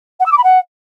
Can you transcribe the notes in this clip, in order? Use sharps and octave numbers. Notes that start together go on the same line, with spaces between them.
F#5
E6
D6
B5
F#5